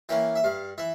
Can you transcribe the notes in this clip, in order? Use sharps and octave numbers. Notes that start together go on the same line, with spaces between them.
E3 A#3 C#4 G5
E5
G2 F5
E3 E5